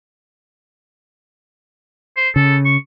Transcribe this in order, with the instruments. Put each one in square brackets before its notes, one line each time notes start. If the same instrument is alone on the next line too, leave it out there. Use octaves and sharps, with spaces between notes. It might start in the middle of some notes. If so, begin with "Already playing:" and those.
[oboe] C5
[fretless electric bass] C#3 [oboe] A4
[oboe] C#6